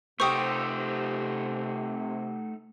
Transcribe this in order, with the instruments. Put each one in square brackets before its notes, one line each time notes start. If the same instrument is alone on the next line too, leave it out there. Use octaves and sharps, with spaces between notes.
[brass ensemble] C3 [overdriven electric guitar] A3 D#4 [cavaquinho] G4 C5 [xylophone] C#6 D#6